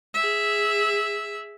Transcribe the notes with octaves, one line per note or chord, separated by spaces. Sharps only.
G#4 E5